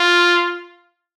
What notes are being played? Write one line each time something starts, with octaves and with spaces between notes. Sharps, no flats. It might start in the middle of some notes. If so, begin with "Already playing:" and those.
Already playing: F4